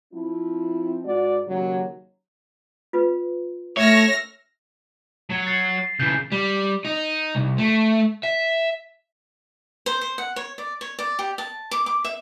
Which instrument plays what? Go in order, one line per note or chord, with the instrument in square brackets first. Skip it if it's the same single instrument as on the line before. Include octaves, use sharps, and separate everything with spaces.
[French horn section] F3 C4 E4
G#2 F#4 D5
D#2 C#3 F#3
[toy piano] F4 B4
[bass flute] A3 [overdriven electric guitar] C#5 [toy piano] E5 [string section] E6 F6 A#6
[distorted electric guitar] F#3 C#5
[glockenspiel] A6 C7
[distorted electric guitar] C#3 E3 [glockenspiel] G6
[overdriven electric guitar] G3
D#4
C2
A3
E5
[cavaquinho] C5
C5
F#5
C#5
D5
C#5
D5
G4
A5
D6
D6
E5